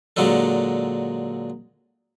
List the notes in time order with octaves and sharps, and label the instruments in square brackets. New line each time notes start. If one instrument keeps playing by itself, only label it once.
[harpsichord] A#2 D3 F#3 G#3 D4 A4